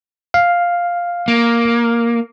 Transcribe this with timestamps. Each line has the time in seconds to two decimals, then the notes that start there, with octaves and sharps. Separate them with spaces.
0.34 F5
1.28 A#3